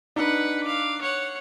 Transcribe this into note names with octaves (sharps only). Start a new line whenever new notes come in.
D4 D#4 B4 F#5
F5 D6
C#5 F#5